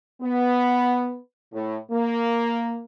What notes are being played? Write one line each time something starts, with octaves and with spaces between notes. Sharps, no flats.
B3
A2
A#3